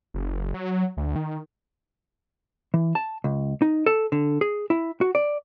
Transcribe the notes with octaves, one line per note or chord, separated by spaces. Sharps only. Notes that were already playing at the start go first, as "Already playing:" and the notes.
F#1
F#3
D2
D#3
E3
A5
C#2
D#4
A4
D3
G#4
E4
F#4
D5